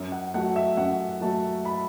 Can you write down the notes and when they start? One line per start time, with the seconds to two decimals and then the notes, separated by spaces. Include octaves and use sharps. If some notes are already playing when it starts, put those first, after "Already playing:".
Already playing: F#2
0.12 F#5
0.34 A3 F#5
0.38 F#3
0.56 E5
0.77 F#2 F#5
1.21 F#3 A3 A5
1.65 B5